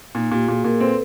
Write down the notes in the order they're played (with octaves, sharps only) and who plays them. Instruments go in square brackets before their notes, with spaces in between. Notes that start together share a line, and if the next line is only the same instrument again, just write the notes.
[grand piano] A#2 [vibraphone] D#4
[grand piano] A#2 [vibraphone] F4 G4
[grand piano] A#2 [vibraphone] F#4 G#4
[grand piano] A#2 [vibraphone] G#4 A#4
[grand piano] C4 [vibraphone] A4 B4